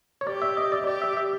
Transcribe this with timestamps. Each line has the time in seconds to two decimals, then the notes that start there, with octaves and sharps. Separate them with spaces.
0.21 C#5
0.26 G4 D5
0.42 E5
0.57 D#5
0.72 D5
0.86 G4 D5
1.02 E5
1.17 E5